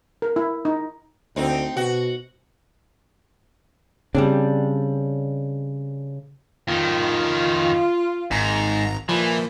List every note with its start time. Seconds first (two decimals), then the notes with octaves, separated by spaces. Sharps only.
0.22 A#4
0.36 E4
0.65 D#4
1.36 D2 C4 D#4
1.76 B2 F#4
4.15 C#3 G3 C4 D4
6.68 F2 D#3 F4
8.31 G#1 G#2 A#5
9.09 A#2 E3 F3